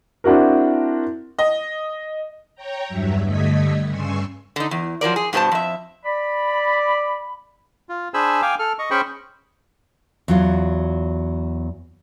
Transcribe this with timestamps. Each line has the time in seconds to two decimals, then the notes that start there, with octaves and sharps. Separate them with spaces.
0.24 C4 D4 E4 F#4 A#4
1.39 D#5
2.55 C#5 G5 A#5
2.88 E2 G2 F#3 E5
3.25 G2 D3 A3 D#5 G#6 B6
3.87 G2 C#3 G#5 C6 C#6 E6
4.56 D3 D#4
4.71 E2
5.01 F3 F#3 A#4 D5
5.16 G#4
5.33 G2 B2 G#4 C5 A5
5.52 F2 E5
6.05 D5 B5
7.89 F4
8.14 D4 G#4 C5 G#5 B5 E6
8.42 F5 G5 G#5 D6
8.59 A4 F6
8.79 D#5 C#6
8.91 C#4 G#4 C5 G5 B5 C#6
10.28 E2 F#3 F4